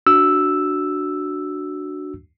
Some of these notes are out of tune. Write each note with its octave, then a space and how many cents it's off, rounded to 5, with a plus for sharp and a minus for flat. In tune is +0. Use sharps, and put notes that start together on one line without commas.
D4 +0 F#4 +0 E6 +0